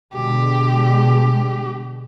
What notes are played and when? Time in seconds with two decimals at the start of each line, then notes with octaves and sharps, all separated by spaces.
0.14 B2 D3 G#3 G4